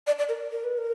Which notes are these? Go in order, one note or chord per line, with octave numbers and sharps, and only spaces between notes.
D5
D5
A#4
A#4
B4
A#4